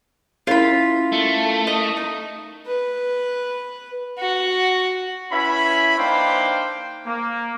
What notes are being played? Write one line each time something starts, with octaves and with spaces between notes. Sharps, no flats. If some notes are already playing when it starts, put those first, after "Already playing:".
C#4 E4 F4 A#4 B5
A3
D#5
D#4
B4
F#4
C#4 E4 B4 E5 B5
A#3 D4 D#4 C5 F5 G5
A#3